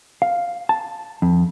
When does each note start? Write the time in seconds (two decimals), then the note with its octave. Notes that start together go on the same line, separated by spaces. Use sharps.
0.22 F5
0.69 A5
1.22 F2